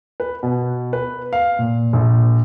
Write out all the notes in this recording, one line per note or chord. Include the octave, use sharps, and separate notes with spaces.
B4
B2
B4
F5
A#2
A#1